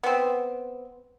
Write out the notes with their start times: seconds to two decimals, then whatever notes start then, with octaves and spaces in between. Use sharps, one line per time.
0.03 B3 C4